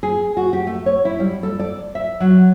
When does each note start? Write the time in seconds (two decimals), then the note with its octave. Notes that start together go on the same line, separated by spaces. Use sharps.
0.03 G#4
0.37 F#4
0.53 G4
0.67 A3
0.86 C#5
1.05 E4
1.20 G3
1.43 A4
1.59 D5
1.95 E5
2.20 F#3